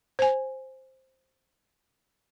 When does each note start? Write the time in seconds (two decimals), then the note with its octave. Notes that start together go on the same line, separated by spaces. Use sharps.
0.19 C5 G#5